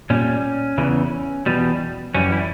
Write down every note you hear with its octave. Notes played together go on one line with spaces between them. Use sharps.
A#2 G3 C#4
E2 C#3 E3
E2 B2 G3
F#2 E3 G3 C#4
E4